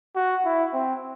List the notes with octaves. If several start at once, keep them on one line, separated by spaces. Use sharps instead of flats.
F#4
E4
C4